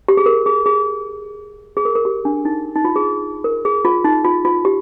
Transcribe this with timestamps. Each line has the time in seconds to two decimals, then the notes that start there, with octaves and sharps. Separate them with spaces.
0.08 G4
0.17 G#4
0.26 A#4
0.46 G#4
0.66 G#4
1.77 G#4
1.85 A#4
1.95 A#4
2.05 G4
2.25 D4
2.45 D#4
2.75 D#4
2.85 F4
2.96 G#4
3.44 A#4
3.65 G#4
3.85 F4
4.04 D#4
4.24 F4
4.45 F4
4.65 G4